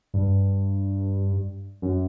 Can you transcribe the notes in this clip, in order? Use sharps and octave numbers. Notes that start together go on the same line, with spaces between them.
G2
F#2